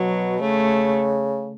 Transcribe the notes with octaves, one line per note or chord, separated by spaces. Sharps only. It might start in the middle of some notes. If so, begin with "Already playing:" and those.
Already playing: B2 F#3
C#3 A3